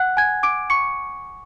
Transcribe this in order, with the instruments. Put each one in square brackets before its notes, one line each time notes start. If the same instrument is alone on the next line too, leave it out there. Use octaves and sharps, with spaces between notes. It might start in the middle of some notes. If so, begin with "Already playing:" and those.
Already playing: [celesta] F#5 F#6
G#5 G#6
D6 D7
C#6 C#7